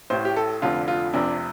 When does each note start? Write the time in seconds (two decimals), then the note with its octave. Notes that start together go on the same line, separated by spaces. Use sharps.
0.10 A1 A2 C5
0.25 G4
0.36 A4
0.62 F1 F2 D3 F4
0.88 F4
1.13 F1 F2 C3 D4